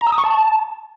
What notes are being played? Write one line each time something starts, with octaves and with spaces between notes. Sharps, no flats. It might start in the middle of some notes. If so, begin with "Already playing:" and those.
A#5
E6
D#6
C#6
A5